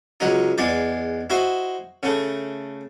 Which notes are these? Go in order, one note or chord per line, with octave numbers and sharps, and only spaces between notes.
C#2 F#3 D#4
E2 G#3 D5 G5
E4 F#4 C5 D#5
C#3 A3